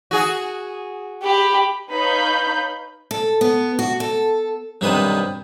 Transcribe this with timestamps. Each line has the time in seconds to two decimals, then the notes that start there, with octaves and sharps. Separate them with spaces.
0.11 F#4 G#4
1.23 G4 B5
1.92 D#4 B4 C#5 F5 B5 G6
3.11 A4
3.41 B3
3.79 F#4
4.00 A4
4.81 B1 G2 C3 D#3 B4 D#6